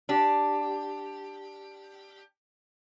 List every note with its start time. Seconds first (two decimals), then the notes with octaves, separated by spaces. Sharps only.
0.09 D4 G4